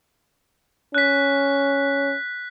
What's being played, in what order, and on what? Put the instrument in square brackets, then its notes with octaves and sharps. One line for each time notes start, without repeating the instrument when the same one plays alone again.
[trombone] C#4 [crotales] F#6 B6